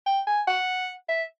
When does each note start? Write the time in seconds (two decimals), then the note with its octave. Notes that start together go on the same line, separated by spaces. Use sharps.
0.06 G5
0.27 G#5
0.47 F#5
1.09 E5